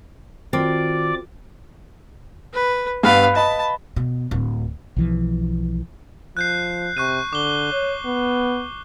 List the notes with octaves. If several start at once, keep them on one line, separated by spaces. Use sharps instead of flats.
D#3 C4 F4 F#4 A4 D5 D6
B4
G2 B3 B4 F5
D#5 A5 B5
B2
D1
B1 E3 F3
F3 F#6 G6 C7
C3 C#6 F#6 D#7
D3 D6 G7
C#5
B3